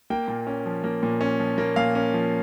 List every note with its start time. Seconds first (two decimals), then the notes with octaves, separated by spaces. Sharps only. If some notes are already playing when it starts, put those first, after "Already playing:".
0.10 A#3 G5
0.28 A#2
0.47 C#4
0.66 F3
0.84 A#3
1.03 A#2
1.21 C#4
1.39 F3
1.58 A#3
1.76 A#2 F5
1.95 C#4
2.14 F3